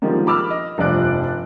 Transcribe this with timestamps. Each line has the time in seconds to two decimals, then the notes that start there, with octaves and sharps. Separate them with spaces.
0.02 D3 D#3 F3 G3 G#3 A#3
0.27 B5 D6 E6 F6
0.50 D#5
0.78 F1 G2 F3 D5 F#6 D7